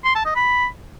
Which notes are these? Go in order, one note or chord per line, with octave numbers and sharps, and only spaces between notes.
C6
A5
D#5
B5